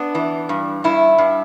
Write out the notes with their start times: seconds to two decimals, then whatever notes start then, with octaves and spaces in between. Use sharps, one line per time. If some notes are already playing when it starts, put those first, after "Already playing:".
Already playing: B3 D4
0.15 E3
0.49 G2
0.84 G2 E4
1.18 G2